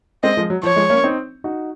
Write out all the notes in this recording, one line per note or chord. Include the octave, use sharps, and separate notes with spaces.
G#3 C4 D#5
F3 G#3
F#3
F3 C#5
F3 G#3
A#3 C#4
C4 D#4
D#4 F#4